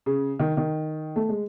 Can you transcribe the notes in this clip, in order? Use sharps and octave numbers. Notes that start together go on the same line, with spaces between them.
C#3
D#3
D#3
A3
G#3